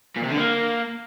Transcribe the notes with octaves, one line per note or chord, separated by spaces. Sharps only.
A#2
C3
D3
A#3